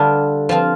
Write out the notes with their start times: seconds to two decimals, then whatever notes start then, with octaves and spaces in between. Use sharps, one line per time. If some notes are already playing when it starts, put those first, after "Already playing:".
Already playing: D3 G3 D4 F4
0.49 F3 C4 F4